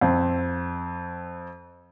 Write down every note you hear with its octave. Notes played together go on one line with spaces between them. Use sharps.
F2 C4